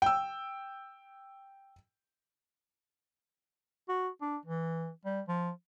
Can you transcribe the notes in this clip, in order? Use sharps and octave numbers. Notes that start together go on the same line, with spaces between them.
G5 E6
F#4
D4
E3
G3
F3